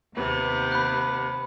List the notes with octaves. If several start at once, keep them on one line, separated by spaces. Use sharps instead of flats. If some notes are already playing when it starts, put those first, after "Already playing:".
D#2 C3 B3
B5 F#6